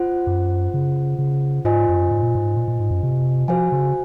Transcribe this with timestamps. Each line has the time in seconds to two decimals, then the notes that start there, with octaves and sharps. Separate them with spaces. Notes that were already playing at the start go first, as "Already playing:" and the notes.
Already playing: F4 C5 F#5
0.27 F#2
0.74 C#3
1.18 C#3
1.64 G#2 F4 C5 D#5 G#5
1.89 F#2
2.11 G#2
2.23 A#2
2.35 G#2
2.56 A#2
2.68 A#2
2.80 G#2
2.91 F#2
3.03 C3
3.48 F3 F#4 C5 F5 G#5
3.72 C#3